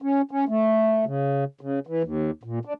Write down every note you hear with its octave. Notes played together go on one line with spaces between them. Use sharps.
C#4
C#4
A3
C#3
C#3
E3
D#2
A#2
D4